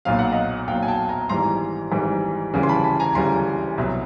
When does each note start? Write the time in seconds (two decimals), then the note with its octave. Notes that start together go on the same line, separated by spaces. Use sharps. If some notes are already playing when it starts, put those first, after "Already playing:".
0.05 B1 A#2 F#3 F5
0.19 F#5
0.32 D#5 F5
0.68 B1 A#2 F#3 F5 G5
0.83 G#5
0.88 G5 A5
1.09 G#5 A#5
1.29 G#1 G#2 E3 G3 A#5 C6
1.91 G#1 G#2 E3 G3
2.54 D2 C#3 E3 G3
2.63 C6
2.69 A5 B5
2.84 A5 B5
3.00 G#5 A#5
3.15 D2 C#3 E3 G3 A#5 C6
3.78 C2 B2 F#3